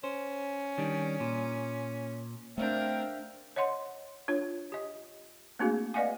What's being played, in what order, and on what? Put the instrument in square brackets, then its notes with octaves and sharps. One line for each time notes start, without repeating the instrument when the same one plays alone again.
[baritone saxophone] C#4 [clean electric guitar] C5
[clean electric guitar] D#3 G3 D4
A#2
[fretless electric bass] A3 C4 [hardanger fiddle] D4 A#4 [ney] C5 [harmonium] E5 F5 G5
[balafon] C#5 D#5 F#5 C6
D4 F4 C#5
G4 D#5
A3 A#3 C4 D4 F#4 G#4
B4 D5 D#5 F5 F#5 G#5